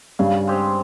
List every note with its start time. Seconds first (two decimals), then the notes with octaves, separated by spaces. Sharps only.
0.19 G2 C#3
0.48 G#3 C4 G4